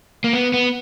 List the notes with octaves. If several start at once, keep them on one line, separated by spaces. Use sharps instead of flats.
A#3
B3
B3